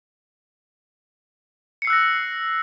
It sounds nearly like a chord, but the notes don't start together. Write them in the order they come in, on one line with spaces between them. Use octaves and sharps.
C#7 C7 E6 F#6 A#6